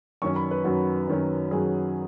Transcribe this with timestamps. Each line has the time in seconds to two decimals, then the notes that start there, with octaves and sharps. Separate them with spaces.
0.22 F#2 D#3 F#3 C#4 C#6
0.36 B5
0.51 B4
0.64 F#2 D#3 F#3 C#4 F#4
1.08 F#2 D#3 F#3 C#4
1.51 F#2 D#3 F#3 C#4 G#4